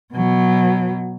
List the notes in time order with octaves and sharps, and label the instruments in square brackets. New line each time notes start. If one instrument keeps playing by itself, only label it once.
[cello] B2 F#3